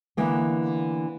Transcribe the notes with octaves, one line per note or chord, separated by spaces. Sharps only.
D3 E3 A#3 B3